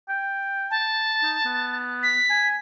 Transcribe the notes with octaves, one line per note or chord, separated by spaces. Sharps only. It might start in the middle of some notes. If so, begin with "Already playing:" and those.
G5
A5
D#4
B3
B6
G#5